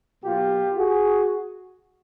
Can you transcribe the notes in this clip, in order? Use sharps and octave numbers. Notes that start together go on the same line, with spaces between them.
B2 F#3 A#3 F4 G4
F#4 G#4